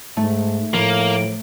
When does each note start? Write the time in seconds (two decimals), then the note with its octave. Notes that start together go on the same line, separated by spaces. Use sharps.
0.17 G#2 A3
0.74 A2 F3 A#3